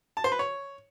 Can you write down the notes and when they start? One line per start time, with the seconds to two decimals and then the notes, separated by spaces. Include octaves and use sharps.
0.17 A5
0.24 C5
0.32 B4
0.39 C#5